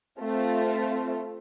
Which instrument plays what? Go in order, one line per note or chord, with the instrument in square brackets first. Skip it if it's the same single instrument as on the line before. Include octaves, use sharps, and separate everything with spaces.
[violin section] A3 C4 F4